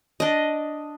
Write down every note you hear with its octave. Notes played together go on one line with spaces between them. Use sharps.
D4 D#5